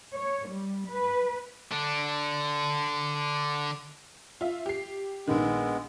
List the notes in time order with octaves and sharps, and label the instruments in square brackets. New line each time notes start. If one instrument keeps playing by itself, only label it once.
[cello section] C#5
G3
B4
[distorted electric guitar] D3 D4
[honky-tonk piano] F4 E5
G4 C7
[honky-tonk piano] A#1 D#3 [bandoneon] G#3 B3